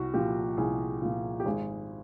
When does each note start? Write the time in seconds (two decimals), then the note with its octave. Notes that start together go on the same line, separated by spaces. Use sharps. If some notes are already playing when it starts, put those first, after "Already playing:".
Already playing: C2 F#4
0.14 A#2 F3 G4
0.57 C2 G#4
1.02 A#2 F3
1.40 G4
1.45 G#1 G#4